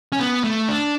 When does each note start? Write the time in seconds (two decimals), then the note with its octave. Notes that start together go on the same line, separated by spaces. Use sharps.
0.12 C#4
0.20 B3
0.44 A3
0.68 D4